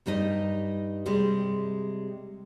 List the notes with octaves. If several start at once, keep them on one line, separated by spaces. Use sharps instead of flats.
G2 G3 D#4 D#5
C3 G3 G#3